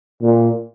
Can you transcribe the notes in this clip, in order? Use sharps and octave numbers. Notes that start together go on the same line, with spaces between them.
A#2